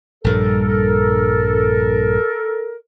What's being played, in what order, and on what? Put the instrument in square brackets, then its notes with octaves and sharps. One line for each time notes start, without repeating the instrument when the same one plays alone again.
[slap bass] A#1 G2 G3 [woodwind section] A4 A#4